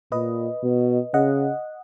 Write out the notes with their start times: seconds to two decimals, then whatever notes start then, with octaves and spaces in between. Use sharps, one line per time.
0.12 A#2 B4 D#5
0.63 B2
1.14 C#3 D#5 F#5